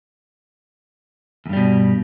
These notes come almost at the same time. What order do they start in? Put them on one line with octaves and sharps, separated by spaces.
E2 G2 G3 B2